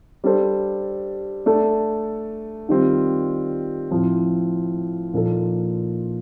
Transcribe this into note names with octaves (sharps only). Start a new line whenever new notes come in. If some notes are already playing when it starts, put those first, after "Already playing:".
G3 D4 A4 C5
A3 D4 A4
D#3 G3 C4 F4
A2 F3 C4
A#2 F3 A#3 D#4 A4